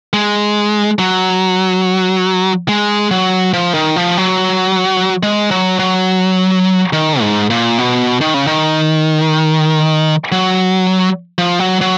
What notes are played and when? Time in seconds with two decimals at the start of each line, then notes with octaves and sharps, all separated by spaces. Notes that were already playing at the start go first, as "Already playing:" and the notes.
0.13 G#3
0.99 F#3
2.69 G#3
3.11 F#3
3.53 F3
3.74 D#3
3.96 F3
4.17 F#3
5.23 G#3
5.51 F#3
5.79 F#3
6.93 D#3
7.21 G#2
7.50 A#2
7.78 B2
8.21 D#3
8.34 C#3
8.47 D#3
10.32 F#3
11.38 F3
11.59 F#3
11.81 F#3